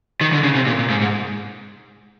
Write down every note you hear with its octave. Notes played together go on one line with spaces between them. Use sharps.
D#3
D3
C#3
C3
A#2
A#2
G#2
G#2